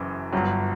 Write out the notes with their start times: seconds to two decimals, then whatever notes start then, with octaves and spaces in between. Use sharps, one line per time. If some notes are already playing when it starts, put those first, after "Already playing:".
Already playing: F#1 F#2 E3
0.32 G1 G2 F#3